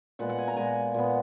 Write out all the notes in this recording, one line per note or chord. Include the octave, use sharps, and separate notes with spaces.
A#2 G#3 B3 F#5
F#5
G#5
A#5
A#2 G#3 B3 G#5
A#2 G#3 B3